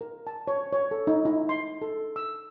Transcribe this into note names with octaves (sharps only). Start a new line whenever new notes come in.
A#4
A5
C#5
C#5
A4
D#4
E4
C6
A4
E6